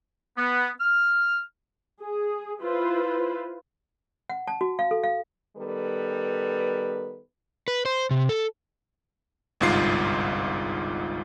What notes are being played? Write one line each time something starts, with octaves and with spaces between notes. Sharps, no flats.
B3
F6
G#4
E4 F4 B4 C5
F#5
A5
F#4
F5
A4
F5
D#3 G3 B3 A4 B4
B4
C5
C3
A4
G1 C2 G#2 F4 C7